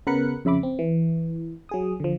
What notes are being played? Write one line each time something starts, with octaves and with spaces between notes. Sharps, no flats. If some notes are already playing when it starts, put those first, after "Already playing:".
C#3 B3 A#4 B5 F#6 C#7
F2 C#3 E5 B5 D6
C4
E3
F#3 G#4 D#6
D3 F3